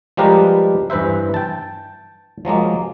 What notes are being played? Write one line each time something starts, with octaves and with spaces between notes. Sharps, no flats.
F3 G3 G#3 G4 A#4 B4
G2 E3 B4 C5 E5
G5 A5
F3 F#3 G#3 A#3